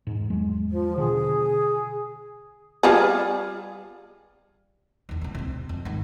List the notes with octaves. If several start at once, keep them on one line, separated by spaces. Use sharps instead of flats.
E1 G#2
E2 F#3 G#3
F3
B2 D3 G#4
G3 F4 G#4
E2 D#3
C2 C3
D2 C3
F2
G#1 D#3